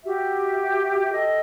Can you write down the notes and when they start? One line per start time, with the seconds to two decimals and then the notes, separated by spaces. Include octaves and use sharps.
0.04 F#4 G4 E5
1.12 A4 D#5 G5